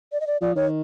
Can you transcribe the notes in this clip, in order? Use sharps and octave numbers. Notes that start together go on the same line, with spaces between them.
D5
D#5
D5
F3 D5
D#3 C#5